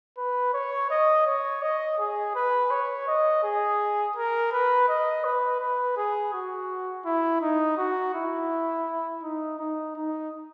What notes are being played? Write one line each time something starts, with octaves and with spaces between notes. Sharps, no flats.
B4
C#5
D#5
C#5
D#5
G#4
B4
C#5
D#5
G#4
A#4
B4
D#5
B4
B4
G#4
F#4
E4
D#4
F#4
E4
D#4
D#4
D#4